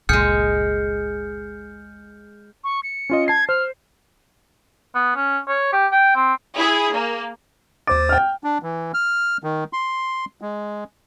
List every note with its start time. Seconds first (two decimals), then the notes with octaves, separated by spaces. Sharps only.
0.09 G1 C#2 A#2 G#3 G#4 F6 G6 C#7
2.64 C#6
2.83 C#7
3.10 C#4 F4 D#5
3.28 A5 G#6 C7
3.49 C5 F6
4.95 B3
5.16 C#4
5.48 C#5
5.72 G4
5.92 G5
6.15 C4
6.58 E4 G#4
6.93 A#3
7.87 D#2 C5 D6 A6
8.09 G5 F6
8.44 D4
8.62 E3
8.94 F6
9.43 D#3
9.73 C6
10.41 G#3